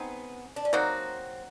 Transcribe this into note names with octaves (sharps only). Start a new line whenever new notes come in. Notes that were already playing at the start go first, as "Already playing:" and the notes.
Already playing: B3 C4 D#4 G#4
D4
C#4
F#3 A#3 C4 D#4 F#4